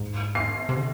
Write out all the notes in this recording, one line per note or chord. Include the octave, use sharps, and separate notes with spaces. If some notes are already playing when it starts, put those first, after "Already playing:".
Already playing: G#2
C7
C3
D3